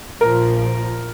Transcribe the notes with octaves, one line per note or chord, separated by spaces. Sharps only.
A#1 A#2 F3 A#4